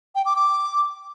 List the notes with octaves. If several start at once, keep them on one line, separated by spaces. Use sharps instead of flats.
G5
D6
D6